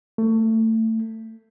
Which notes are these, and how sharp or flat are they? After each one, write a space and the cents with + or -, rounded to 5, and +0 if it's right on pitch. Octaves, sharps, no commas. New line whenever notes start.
A3 +25